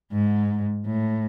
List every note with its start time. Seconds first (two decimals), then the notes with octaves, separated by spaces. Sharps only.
0.12 G#2
0.85 A2